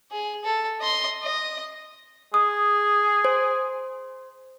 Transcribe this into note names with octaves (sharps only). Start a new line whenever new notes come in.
G#4
A4
D#5 C6
D#5
G#4 D#6
C5